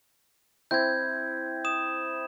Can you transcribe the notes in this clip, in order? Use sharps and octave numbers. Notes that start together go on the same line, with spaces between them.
C4 E4 G6 G#6
D#6 E7